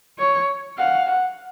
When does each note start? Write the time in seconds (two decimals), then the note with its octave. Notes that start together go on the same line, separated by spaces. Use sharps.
0.19 C#5
0.78 F5 F#5
1.07 F#5